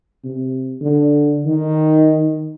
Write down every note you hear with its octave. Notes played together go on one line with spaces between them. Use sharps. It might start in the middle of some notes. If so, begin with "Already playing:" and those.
C3
D3
D#3